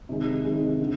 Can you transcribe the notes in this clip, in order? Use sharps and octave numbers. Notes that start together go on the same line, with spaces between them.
C3 D#3 G#3
C3 D#3 G#3
D3